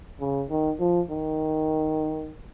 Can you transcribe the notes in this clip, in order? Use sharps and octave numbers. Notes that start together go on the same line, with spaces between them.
C#3
D#3
F3
D#3